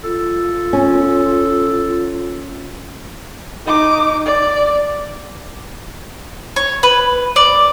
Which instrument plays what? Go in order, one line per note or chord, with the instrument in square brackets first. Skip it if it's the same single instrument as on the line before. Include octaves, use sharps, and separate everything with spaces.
[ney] F4 [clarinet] A4
[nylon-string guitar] C#4
[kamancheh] D#4 D6
D5
[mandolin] C#5
B4
D5